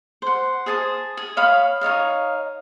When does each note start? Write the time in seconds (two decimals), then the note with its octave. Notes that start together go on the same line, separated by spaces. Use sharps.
0.22 C5 F#5
0.66 G#4 C5 A5 D#6
1.17 G#4
1.37 C#5 F5 B5 D#6
1.81 D#4 C#5 D#5 F5